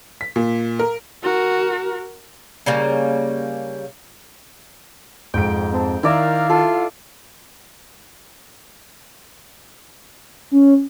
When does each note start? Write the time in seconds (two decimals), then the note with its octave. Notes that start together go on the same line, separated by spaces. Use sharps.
0.21 B6
0.36 A#2
0.79 A#4
1.23 F#4 A#4
2.66 C#3 G3 A#3
5.34 F2 G#2 G5 D7
5.73 C4 A5
6.03 D#3 E4 A#4 D5 E5 F5
6.50 F4 A4
10.51 C#4